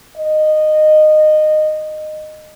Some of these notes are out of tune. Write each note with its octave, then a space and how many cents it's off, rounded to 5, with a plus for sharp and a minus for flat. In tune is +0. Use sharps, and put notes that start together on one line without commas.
D#5 -15